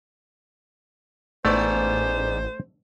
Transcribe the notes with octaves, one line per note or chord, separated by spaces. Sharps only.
A1 G#2 A3 B3 C5 D5